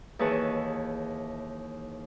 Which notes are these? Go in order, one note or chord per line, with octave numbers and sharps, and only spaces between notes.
D#2 E3 G#4 B4 C#5 A5